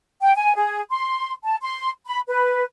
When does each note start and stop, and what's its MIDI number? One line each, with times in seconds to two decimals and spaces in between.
0.21 0.34 79
0.35 0.53 80
0.56 0.81 68
0.91 1.32 84
1.44 1.56 81
1.62 1.89 84
2.06 2.19 83
2.28 2.63 71